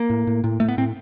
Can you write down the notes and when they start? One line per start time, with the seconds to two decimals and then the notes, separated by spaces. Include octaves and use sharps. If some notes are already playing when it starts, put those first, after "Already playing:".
Already playing: A#3
0.10 A2
0.27 A2
0.44 A2
0.60 A2 A3
0.68 B3
0.78 A2 C4